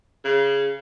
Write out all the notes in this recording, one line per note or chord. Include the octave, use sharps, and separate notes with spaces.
C#3